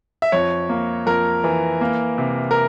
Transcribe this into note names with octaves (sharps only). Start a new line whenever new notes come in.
E5
F2 C#5
A#3
F2 A#4
E3
A#3
C3
A#4